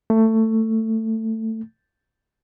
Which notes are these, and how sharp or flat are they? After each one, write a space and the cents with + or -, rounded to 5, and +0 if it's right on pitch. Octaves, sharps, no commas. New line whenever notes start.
A3 +15